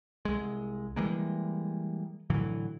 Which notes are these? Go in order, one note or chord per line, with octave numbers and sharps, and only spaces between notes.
C2 G#3
E3 G3 G#3 A#3
A2 D3 E3 F#3